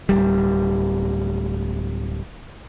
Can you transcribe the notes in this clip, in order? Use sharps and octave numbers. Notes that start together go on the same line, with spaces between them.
D1 C2 G3